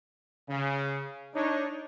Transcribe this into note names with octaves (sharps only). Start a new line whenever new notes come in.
C#3
D4 D#4 C#5